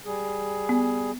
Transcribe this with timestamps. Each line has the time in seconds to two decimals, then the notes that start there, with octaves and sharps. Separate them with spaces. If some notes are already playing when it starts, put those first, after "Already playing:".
0.06 G3 G#4
0.69 B3